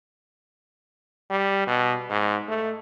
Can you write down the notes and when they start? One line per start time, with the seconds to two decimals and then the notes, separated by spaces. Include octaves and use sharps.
1.30 G3
1.67 B2
2.10 G#2
2.48 A3